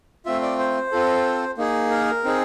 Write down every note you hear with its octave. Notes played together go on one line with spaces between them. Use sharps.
A3 C4 F4 E5
D5
C5
C4 F4 A4
A#3 D#4 G#4
A#4
C4 D#4 G#4